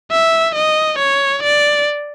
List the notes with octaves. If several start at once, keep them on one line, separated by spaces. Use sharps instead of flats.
E5
D#5
C#5
D5